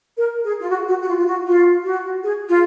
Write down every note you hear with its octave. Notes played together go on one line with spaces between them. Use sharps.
A#4
G#4
F4
F#4
F#4
F#4
F4
F4
F#4
F4
F#4
G#4
F4